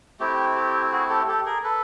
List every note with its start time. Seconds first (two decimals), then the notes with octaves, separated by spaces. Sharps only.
0.20 A3 C4 E4 G4
0.56 G4
0.92 F#4 G#4
1.10 G4 A4
1.28 G4 A4
1.46 G#4 A#4
1.64 A4 B4